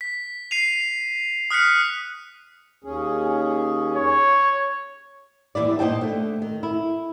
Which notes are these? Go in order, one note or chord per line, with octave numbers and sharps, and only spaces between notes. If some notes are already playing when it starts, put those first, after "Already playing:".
B6
C7 D#7 F7
D#6 F6 F#6 B6 C#7
D#2 C#4 G#4
C#5
D#2 E3 E4 D5
A#2 D#4 C5 G5 A5
D3 A3
D#3
E4